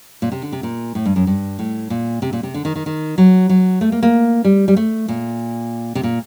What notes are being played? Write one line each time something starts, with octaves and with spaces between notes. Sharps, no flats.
A#2
C3
D3
C3
A#2
A2
G2
F#2
G2
A2
A#2
C3
A#2
C3
D3
D#3
D#3
D#3
F#3
F#3
A3
A#3
A#3
G3
G3
A3
A#2
C3
A#2